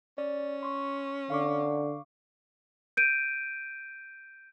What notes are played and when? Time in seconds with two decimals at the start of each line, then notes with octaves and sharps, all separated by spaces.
0.18 C#4 D5
0.63 C6 C#6
1.30 D3 F5 C#6 D6
2.97 G6 D7 D#7